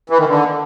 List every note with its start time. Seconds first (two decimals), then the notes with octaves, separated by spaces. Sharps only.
0.10 E3
0.19 D#3
0.28 D3